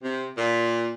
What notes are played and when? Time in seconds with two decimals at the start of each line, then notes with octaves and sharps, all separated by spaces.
0.02 C3
0.38 A#2